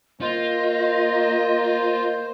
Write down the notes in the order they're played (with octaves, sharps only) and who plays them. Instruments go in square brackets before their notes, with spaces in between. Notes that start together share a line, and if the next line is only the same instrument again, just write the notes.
[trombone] A#3 [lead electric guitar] F4 [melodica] C5 [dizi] D#5